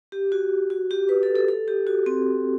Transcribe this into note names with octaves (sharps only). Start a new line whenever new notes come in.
G4
F#4
F#4
G4
B4
A4
A4
A4
G4
F#4
C4